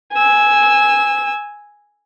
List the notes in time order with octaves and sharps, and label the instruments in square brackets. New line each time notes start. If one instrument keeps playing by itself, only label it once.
[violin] G#5 E6